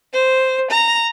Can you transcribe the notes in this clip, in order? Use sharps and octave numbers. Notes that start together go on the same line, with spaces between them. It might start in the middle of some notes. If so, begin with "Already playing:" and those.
C5
A#5